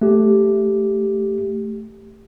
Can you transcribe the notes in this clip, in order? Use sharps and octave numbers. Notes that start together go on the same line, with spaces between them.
A3 G4